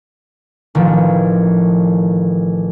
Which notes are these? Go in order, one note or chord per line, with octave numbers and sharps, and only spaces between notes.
A1 D#3 F3